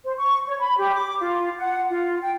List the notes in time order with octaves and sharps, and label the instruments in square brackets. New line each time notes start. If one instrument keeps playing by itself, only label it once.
[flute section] C5
C#6
C#5
B5
G4
D6
F4
F#5
F4
G5